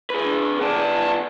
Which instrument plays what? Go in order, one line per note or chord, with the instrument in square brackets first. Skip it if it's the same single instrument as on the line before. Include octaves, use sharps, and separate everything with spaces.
[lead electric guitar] G#4 B4
[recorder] D4
[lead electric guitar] B3 D5 [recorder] A5